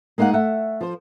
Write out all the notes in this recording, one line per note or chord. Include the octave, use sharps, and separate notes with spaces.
G#3 A#3 D#4 F5 F#5
A3 E5 F#5
F3 C5